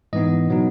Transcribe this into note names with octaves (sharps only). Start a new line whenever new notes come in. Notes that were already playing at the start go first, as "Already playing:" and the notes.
G#2 E3 B3 D#4 D#5
B2 F#3 B3 D#4